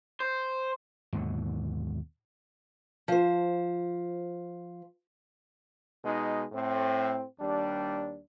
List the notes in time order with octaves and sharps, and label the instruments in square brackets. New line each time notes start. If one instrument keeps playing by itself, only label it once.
[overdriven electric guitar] C5
[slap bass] D#2 G#2 B2 D3
[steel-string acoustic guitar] F3 C5
[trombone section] B2 G#3 D#4
A2 C4
D#2 G3 D4